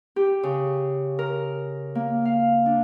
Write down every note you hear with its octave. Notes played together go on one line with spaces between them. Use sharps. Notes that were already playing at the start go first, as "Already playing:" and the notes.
G4
C#3
A#4
A#3
F5
D4